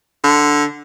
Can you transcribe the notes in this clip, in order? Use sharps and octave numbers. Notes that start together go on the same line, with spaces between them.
D3